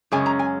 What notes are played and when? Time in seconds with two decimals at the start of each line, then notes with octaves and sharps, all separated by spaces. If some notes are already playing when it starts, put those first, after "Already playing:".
0.12 F#2 C#3 G#3 C#4 G#5
0.26 A#5
0.39 G#5